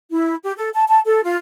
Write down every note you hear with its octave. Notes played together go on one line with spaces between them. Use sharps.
E4
G4
A4
A5
A5
A4
F4